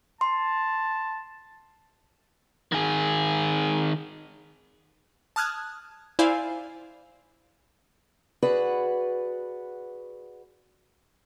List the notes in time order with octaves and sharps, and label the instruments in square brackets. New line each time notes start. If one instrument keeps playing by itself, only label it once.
[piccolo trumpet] A5 [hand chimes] C6
[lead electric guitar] D#3 G#4
[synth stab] A5 D#6 F6 F#6 G#6
E4 C5 D5 F5 G#5
[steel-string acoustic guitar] F#4 G#4 B4 D5 F#5